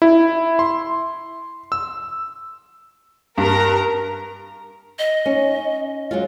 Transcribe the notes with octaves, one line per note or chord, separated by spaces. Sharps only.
E4
C6
E6
G2 A#4 A#5
D#5
C#4 D#4
F#3 G#3 F4